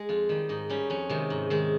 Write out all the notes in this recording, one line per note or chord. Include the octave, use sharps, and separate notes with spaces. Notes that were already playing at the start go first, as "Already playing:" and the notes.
Already playing: G#3
F2 F4
D#3 G3
G#2 D#4
G3 C#4
F2 C#4
C3 D#3 G#3
G#2
D#3 G#3